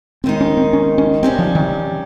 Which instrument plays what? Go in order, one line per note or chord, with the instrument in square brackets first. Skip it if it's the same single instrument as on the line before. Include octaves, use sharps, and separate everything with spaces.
[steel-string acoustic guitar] D#2 D#3 G#3 D#4 [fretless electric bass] C4
[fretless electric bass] C#4
C4
C#4
C#4
[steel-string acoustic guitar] C3 G3 C#4 [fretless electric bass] C4
[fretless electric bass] F3
D#3